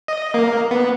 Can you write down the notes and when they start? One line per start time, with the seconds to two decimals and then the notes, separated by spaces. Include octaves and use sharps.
0.08 D#5
0.34 A#3
0.71 B3